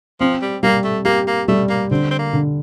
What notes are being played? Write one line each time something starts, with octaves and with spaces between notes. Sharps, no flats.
F3 C4
G3
G3 A#3
A3
A#3 G4
A#3
G3 A3
A#3
D3 C4
C4
A#3
D3